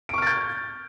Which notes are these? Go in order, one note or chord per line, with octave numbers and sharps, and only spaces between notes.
C#6 F6 G6 A6 D7